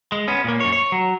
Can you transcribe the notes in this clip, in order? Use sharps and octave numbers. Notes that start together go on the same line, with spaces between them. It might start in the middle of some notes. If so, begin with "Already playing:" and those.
G#3
B3 C#4
A#2 A#3
F#2 C#5
C#5
F#3